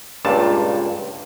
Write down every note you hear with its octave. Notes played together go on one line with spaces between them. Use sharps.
C#2 G2 A#2 A5